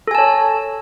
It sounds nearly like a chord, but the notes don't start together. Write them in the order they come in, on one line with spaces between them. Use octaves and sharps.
A4 G#5 A5 C#5